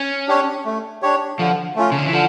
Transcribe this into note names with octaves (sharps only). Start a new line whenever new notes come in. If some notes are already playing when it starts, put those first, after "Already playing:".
Already playing: C#4
D4 G4 C#5
A3
D4 G4 C#5
D3 F3
A3 C#4 F4
C#3
D3
E3
D3 F3